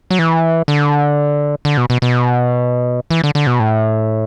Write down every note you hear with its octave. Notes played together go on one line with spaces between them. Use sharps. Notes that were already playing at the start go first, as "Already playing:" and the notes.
F#3
E3
D3
D3
B2
B2
B2
E3
D3
D3
B2
A2